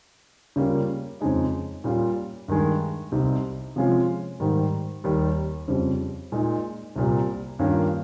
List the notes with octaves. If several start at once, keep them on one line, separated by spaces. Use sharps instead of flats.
C#3 G3 A#3 F4
F2 C#3 G#3 D#4
A#2 G3 C#4 F4
G2 D#3 G#3
C2 C3 G3 C4 D#4
C3 F3 G#3 C#4 F4
G#2 D#3 G3
D#2 D#3 G3
F2 C#3 G3
A#2 G#3 D#4
C2 A#2 G3
G2 D#3 A#3 C#4 F4